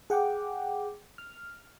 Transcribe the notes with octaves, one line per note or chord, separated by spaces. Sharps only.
G#4 F#5 G5 D6
F6